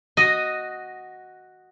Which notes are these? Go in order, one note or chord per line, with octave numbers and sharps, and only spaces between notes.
F#4 D#5